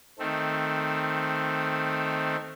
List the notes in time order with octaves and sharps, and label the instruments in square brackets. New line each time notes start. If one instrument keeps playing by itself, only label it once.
[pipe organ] D#3 A3 C4